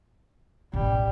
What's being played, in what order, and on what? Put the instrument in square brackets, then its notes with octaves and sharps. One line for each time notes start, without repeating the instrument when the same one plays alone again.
[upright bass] A1 [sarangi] G3